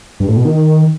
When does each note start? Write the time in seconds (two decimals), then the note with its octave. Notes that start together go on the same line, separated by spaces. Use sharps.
0.20 G2
0.28 A2
0.37 B2
0.45 D#3